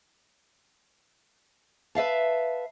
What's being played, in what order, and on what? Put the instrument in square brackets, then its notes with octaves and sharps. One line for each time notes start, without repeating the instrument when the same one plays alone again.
[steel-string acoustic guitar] B4 E5 F5 A5